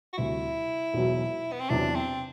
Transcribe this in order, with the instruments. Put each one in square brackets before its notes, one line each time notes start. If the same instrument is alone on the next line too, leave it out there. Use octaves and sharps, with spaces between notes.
[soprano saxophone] F#4
[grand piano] D2 C3 G3 [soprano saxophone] E4
[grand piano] E1 E2 B2 F#3
[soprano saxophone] B3
C4
[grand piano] E2 C3 F#3 [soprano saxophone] D4
[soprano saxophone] C4